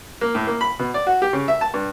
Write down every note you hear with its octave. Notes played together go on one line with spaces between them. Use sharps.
A#3
A2
A#3
B5
B2
D5
F#4
G4
C#3
E5
A5
G2